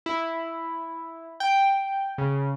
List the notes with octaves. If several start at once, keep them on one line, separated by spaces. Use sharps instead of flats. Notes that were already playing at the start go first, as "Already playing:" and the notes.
E4
G5
C#3